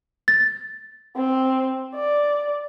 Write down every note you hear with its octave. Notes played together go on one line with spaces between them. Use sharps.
A6
C4
D5